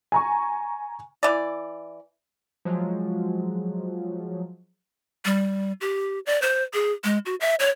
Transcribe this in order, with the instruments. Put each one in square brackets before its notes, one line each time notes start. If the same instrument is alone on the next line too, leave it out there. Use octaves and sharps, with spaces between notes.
[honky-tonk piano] G#5 A#5 C#6
[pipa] E3 D5
[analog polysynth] F3 F#3 G#3
[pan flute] G3
G4
D5
C5
G#4
G#3
F#4
E5
C#5